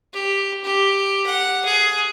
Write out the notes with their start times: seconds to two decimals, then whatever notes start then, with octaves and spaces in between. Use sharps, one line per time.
0.14 G4
0.64 G4
1.27 F#5
1.65 G#4